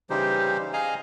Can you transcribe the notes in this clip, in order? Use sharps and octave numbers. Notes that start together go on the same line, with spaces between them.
C#3 E3 G3 D#4 G4 C5
G#4 D#5 F5 G#5 A#5